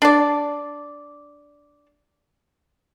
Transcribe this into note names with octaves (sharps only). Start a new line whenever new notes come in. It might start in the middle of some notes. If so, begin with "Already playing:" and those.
D4 D5